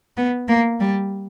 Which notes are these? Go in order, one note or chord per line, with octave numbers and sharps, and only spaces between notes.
B3
A#3
G3